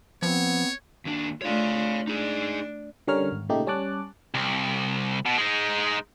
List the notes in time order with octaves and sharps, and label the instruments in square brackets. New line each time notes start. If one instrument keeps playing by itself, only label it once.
[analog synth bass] F3 [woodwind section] B3 C4 [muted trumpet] C#5
[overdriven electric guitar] D#2 D4
[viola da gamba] A3 D4 F4 [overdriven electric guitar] C#5 F5
[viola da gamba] D4 [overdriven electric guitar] D#4 G#4
[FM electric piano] D3 G3 C#4 A#4 C#5 F6
G#1
A#2 C#3 A3 D#4 G4
G3 C#4 C#5 A5 D6 F#6
[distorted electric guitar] C2
B2
G#3 D#4